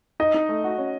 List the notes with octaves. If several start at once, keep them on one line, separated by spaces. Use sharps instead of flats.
D#4 D#5
D#4
A3
F#4
C#4